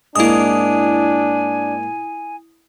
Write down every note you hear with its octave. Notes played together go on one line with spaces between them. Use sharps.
G#2 A#3 D4 E4 G#5 D#6